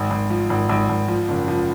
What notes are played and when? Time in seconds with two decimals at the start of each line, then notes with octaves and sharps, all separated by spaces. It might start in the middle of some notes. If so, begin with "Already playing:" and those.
Already playing: G#1
0.11 G#1
0.30 F3
0.50 G#1
0.69 G#1
0.90 G#1
1.08 F3
1.28 F#1
1.48 F3